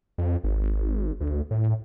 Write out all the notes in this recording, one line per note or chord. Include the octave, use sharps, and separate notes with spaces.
F2
G#1
D2
A2